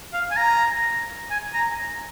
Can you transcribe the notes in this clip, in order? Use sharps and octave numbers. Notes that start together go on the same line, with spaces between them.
F5
G#5
A#5
G#5
A#5